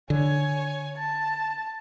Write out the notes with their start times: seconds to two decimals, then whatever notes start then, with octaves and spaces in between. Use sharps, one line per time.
0.10 D3 C#5 G#5
0.96 A5